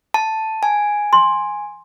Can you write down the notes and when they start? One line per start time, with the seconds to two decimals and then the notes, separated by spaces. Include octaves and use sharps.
0.14 A5
0.63 G#5
1.13 C6